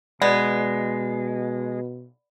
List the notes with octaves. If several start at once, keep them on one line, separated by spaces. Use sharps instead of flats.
B2 G#3 B3 D5